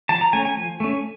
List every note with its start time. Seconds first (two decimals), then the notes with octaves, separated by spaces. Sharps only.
0.09 F3 A5
0.21 A#5
0.33 A3 C#4 G#5
0.45 G#5
0.57 F3
0.80 A3 C#4